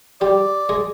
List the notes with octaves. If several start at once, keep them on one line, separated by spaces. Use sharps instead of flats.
G3 G4 D5
G#3 G#4